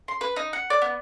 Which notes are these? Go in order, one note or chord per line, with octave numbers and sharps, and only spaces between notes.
C6
B4
D#4
F#5
D5
B3